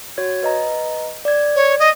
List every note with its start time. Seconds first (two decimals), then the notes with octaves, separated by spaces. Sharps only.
0.18 F#4 C#5 G#6
0.43 B4 D#5 A#5
1.25 D5 G#6
1.55 C#5
1.79 D#5